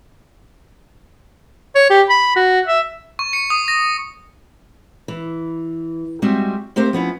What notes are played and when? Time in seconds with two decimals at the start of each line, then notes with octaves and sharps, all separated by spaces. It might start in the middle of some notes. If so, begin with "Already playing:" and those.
1.75 C#5
1.90 G4
2.09 B5
2.36 F#4
2.67 E5
3.19 C#6
3.33 C#7
3.50 D#6
3.68 A#6
5.08 E3
6.22 G3 G#3 C4 F#4 E5
6.76 A3 C4 G4 A#4 C5 F5
6.93 F3 B3 C#4 E4